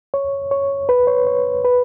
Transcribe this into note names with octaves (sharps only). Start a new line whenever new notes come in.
C#5
C#5
B4
C#5
C#5
B4